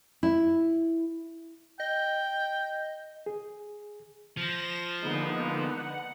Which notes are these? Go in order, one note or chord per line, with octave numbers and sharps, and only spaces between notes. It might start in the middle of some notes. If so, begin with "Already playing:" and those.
E4
D#5 G5
G#4
F3 A#6 E7
D3 G#3 A#3 B3 D#4
F#5